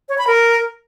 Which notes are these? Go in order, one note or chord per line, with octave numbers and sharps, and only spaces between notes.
C#5
B5
A#4